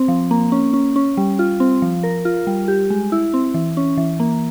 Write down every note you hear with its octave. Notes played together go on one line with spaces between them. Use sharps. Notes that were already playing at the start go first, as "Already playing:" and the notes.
Already playing: C4
F3
A#3
C#4
C#4
C#4
G3
F4
C4
F3
A#4
F4
G3
G4
G#3
E4
C4
E3
C#4
E3
A#3